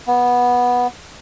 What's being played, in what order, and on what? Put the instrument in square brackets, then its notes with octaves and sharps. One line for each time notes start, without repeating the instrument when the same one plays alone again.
[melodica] B3